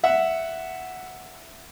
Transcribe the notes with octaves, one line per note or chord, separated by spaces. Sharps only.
E5 F#5